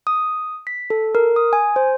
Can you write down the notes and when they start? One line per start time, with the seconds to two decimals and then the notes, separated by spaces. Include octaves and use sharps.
0.07 D#6
0.67 B6
0.90 A4
1.15 A#4
1.36 D#6
1.53 G#5
1.76 C5